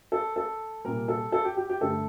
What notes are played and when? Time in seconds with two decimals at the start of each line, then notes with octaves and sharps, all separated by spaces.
0.12 A4
0.36 A4
0.85 C2 A#2 G3 A#4
1.08 A4
1.32 A4
1.45 G4
1.57 G4
1.70 G4
1.81 G2 D3 A3 A4